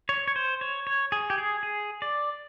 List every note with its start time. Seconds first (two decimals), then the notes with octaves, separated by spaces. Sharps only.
0.09 C#5
0.28 C#5
0.36 C5
0.61 C#5
0.87 C#5
1.12 G#4
1.30 G4
1.38 G#4
1.63 G#4
2.02 D5